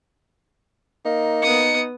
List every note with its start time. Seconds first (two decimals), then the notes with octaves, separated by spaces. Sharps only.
1.06 A#3 D#4
1.42 B3 D#6 C#7